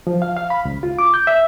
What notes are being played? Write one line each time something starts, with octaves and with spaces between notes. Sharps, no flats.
F3
F5
F5
B5
C#2
F4
D6
G6
E5